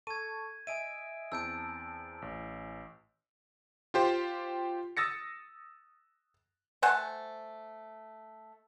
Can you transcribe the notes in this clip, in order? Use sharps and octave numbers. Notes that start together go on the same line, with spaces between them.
A4 A5 C#6 G#6 D#7
D#5 E5 G#5 D7 D#7
E2 C4 A5 E6 G6 D7
A1
F4 G4 C5
D#6 E6 A6 A#6 C#7
A3 C5 F#5 G#5